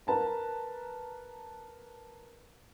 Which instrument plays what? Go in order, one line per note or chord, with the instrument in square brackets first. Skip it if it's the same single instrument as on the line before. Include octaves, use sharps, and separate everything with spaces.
[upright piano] A#4 B4 A5 A#5